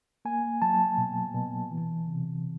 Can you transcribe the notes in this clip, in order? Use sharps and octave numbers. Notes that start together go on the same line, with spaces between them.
A#3 G#5
F#3 A5
B2
B2
E3
C3